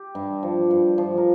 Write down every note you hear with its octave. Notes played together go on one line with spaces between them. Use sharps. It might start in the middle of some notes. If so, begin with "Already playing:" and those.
Already playing: G4
G2
F3
G2
F3
A#4